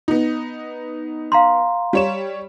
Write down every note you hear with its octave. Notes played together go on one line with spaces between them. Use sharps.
B3 D#4
F5 A#5 C6
G3 C#5 E7